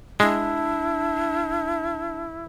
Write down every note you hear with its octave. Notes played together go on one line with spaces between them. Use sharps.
G#3 D4 E4